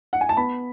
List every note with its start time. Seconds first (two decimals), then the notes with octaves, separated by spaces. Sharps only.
0.13 F#5
0.21 G#5
0.29 A5
0.37 B3 B5